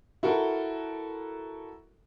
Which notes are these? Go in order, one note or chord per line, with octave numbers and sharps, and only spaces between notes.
E4 F#4 A4 A#4